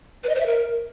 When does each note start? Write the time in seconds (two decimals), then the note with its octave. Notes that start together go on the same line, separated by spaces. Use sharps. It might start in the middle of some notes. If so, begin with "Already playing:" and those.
0.24 B4
0.29 D#5
0.35 C5
0.40 E5
0.46 A#4